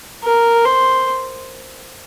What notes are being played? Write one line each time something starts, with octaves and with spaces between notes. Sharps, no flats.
A#4
C5